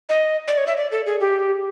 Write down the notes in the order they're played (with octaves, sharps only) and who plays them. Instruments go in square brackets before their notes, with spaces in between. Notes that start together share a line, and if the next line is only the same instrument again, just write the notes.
[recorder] D#5
D5
C#5
E5
D5
A4
G#4
G4